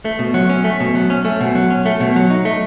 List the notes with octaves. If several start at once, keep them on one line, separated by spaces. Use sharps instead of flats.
A3
B2
F#3
C#4
A3
B2
F#3
C#4
A3
B2
F#3
C#4
A3
B2
F#3
D#4
A3